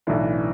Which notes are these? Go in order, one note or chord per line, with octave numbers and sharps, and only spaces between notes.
B1 A2 E3 D4